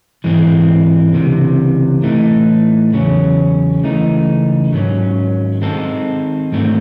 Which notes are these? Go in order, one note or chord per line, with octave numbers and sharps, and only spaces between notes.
G#2 E3 G#3 C4
C#2 C3 E3
A2 E3 A3 D#4
E2 C#3 F#3 C#4
C#2 C#3 E3 A3 D#4
G#2 D#3 F#3 C#4
D#3 G#3 C4 D#4 A4
G#2 D#3 A3 C4